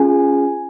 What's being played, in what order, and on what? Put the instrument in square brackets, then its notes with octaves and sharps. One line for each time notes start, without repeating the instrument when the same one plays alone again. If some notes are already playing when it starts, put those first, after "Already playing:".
Already playing: [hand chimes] C#4 F4 G#4 G#5